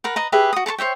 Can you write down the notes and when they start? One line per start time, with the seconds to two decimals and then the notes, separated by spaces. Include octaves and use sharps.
0.04 A#4 B4 F#5
0.16 B4 D#5 A#5
0.32 G4 G#4 B4 E5
0.53 F#4 D#6
0.66 A4 A5 B5 C#6
0.78 C5 C#5 E5 G5